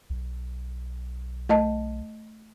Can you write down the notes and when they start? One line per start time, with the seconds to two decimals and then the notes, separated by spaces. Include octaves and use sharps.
0.10 B1
1.49 A3 D#5 A5